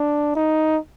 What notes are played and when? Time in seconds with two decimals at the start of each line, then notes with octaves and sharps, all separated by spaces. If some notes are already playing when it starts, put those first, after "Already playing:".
Already playing: D4
0.35 D#4